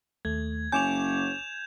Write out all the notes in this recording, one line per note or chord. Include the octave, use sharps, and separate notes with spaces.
D#2 A3 G#6
F#1 C#5 G#5 C#6 D6 G6 E7 F7